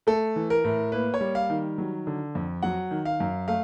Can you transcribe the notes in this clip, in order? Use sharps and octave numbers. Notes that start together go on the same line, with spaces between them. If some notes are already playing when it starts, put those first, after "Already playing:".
A3 A4
E3
A#4
A2
A#3 B4
C#5
G3
F5
D#3
F#3
D3
F2
F#3 F#5
D#3
F5
F#2
A3 F5